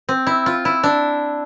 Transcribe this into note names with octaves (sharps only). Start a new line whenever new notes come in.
C4
E4
F4
E4
D4